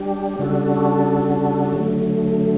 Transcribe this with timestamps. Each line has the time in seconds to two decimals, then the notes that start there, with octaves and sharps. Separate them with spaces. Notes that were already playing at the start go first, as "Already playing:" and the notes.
Already playing: G3 D4 G4
0.39 C#3 G3 D4 F#4 A4
1.74 D3 F#3 A3